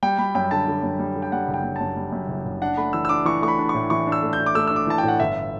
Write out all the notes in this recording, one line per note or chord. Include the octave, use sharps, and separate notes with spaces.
G3 G5
G3 B5
F#2 G5
D3 A5
D3
F#2
G3
D3
G5
G3 F#5
F#1
G5
G3
F#2 A5
G3
F#2
F#1
F#1
D4 F#5
A3 B5
E3 E6
E6
D4 D6
E3 C#6
A3 C#6
B5
D4
A2 C#6
E3 C#6
D4
E6
A3
G6
D4
D6
A3 E6
D4 E6
D6
E3 A5
A2 G5
F#5
G1 E5